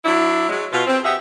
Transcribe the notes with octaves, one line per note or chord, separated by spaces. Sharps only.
F#3 D4 E4
F#3 G#3
B2 F4
C4
G4 G#4 D#5 E5 F#5